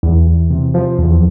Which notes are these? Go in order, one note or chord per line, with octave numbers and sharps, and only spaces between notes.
E2
E2
C3
F3
E2